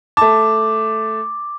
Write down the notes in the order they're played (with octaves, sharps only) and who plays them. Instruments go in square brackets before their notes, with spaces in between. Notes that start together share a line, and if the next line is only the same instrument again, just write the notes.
[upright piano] A3 A5 [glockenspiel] D6